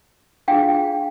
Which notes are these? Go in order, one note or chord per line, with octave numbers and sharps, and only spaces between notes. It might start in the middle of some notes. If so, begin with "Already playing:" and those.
D4 F4 G#4 F5 G5